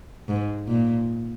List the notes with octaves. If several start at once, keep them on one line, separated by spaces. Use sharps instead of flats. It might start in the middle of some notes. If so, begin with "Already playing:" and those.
G#2
A#2